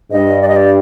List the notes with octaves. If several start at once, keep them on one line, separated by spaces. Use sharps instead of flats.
G2 D#5
D5
D#5
D5